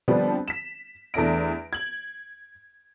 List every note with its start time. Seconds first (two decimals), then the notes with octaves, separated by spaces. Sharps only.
0.08 D3 F3 G3 B3 C4 D4
0.48 B6 E7
1.14 E2 A3 D4 E5 A#6 D7
1.73 G#6 F#7